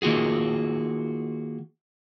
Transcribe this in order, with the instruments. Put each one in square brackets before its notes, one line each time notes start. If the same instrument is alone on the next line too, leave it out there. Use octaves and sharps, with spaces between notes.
[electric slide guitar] D#3 A#3 F4 F#4 G#4